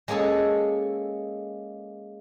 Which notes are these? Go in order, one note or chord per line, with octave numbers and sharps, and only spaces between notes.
G#3 A#3 C#4 G#4 A4